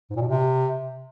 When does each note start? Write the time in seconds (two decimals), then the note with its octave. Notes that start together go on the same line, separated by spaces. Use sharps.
0.10 G#2
0.16 A#2
0.22 B2
0.27 C3